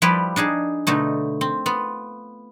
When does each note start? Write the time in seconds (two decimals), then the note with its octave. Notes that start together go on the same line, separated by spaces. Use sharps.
0.02 F3 G3 E4 G4 B4 D5
0.36 D4 D#4 G#4 A5
0.87 B2 D3 A3 D#4
1.41 C4
1.66 B3 F4